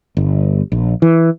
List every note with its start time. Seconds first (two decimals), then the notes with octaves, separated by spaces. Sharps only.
0.17 G1
0.72 A#1
1.02 E3